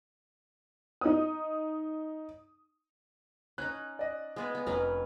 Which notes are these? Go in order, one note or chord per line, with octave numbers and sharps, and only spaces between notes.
D#4 D#6
C#4 D#4 F#6
D5 D#5
G#3 B3 B4
B3
F1 C#4 A#4 B4